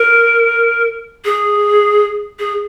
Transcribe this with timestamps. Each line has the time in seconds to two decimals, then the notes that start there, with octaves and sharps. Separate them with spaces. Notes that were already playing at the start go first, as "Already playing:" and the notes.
Already playing: A#4
1.25 G#4
2.39 G#4